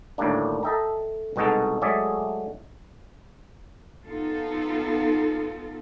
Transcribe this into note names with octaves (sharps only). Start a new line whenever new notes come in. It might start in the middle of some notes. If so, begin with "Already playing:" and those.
D2 A2 D#3 G3 A#3 D4
A4 D#5 E5 G5 A#5
C2 B2 G#3 D#4 F#4 A4
F#3 G#3 A3 G#4 D5 E5
B3 D#4 F4 A4